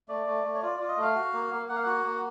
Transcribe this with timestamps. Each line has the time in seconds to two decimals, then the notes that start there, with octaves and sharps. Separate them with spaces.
0.09 A3 D5
0.26 A3
0.44 A3
0.55 C#5
0.62 F4 D5
0.76 F4 D5
0.88 D#5
0.97 A3 F5
1.15 F#4
1.33 A#3
1.52 A#3
1.69 A#3 F#5
1.76 F5
1.83 F#4 F#5
2.04 A#3